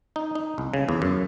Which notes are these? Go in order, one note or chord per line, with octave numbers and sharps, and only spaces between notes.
D#4
D#4
C2
C#3
E2
F#2